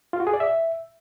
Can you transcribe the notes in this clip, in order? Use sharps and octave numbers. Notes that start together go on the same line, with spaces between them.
F4
F#4
G#4
D5
E5